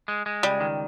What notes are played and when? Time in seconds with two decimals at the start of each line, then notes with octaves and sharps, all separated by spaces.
0.08 G#3
0.26 G#3
0.43 C#2 G3
0.60 D#3